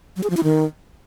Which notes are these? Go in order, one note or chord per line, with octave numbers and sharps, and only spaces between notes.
F#3
G#4
F3
E4
D#3